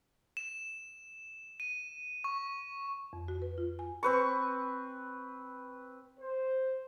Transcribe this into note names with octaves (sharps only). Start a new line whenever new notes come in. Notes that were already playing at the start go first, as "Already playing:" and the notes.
E7
D#7
C#6
F2
F#4
B4
F4
G#5
C4 B4 C#6
C5